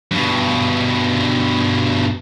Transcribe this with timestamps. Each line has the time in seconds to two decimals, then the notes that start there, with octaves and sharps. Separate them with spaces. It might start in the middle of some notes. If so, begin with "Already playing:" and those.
0.11 G2 B2